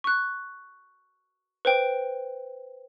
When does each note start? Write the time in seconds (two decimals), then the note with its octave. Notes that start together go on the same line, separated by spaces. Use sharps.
0.04 C#6 F#6
1.65 B4 C5 G5